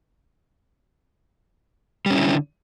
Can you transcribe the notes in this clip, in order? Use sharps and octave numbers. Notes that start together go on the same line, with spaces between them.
D3 G3 C#4 E4